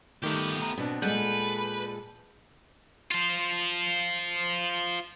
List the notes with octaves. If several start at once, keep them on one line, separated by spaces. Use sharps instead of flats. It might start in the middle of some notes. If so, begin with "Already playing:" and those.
D#3 G3 A3 B3 G4
A3 A#5
B2 B3 C4 D4
A#2 G#3 A4 B4 D5 F#5 G6
F4 C5